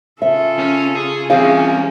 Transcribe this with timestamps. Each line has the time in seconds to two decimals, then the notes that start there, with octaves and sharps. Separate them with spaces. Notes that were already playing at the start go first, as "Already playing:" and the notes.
0.22 C#3 F4 A4 E5
0.58 C#4
0.95 G#4
1.30 E3 G3 C4 C#4 F4 G#4 F5